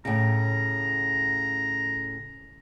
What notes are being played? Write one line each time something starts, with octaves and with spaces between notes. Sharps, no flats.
A2 C#3 A#5